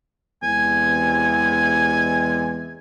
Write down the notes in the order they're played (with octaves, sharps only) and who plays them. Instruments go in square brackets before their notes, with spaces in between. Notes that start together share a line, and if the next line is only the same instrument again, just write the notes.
[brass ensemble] E2 C3 G#3 [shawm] G#5